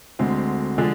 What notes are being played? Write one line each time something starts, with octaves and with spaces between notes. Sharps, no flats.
D2 D3 G#3 C4
D3 F3 G#3 D4 G#4